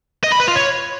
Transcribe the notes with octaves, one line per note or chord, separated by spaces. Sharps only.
D#5
B5
B4
F4
C#5